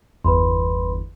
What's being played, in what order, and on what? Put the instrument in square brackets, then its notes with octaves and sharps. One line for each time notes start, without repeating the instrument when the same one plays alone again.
[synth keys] G1 E2 [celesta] B4 B5 C6